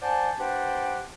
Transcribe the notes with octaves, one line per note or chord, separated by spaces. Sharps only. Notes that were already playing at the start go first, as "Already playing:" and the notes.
C5 D5 F#5 G#5 A5
D4 G4 B4 C5 F#5 G5